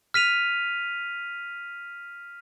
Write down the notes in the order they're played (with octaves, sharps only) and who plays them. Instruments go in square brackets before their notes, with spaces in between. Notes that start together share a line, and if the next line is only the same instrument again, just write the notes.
[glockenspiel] F6 B6 D#7 F7